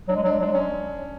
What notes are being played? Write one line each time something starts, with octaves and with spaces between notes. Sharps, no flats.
F#3 D4
G#3
F#3
D4
G#3
F#3
D4
G#3
F#3 C#4